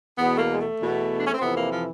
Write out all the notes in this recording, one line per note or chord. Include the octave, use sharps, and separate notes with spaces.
E2 B2 B3
A3
A#3
G#3
A3
E2 B2
D4
C#4
C4
F2 C3 E3 B3
A#3
F3